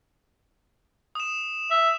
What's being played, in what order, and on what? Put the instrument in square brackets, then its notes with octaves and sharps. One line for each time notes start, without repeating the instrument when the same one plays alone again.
[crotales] D#6 E7
[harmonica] E5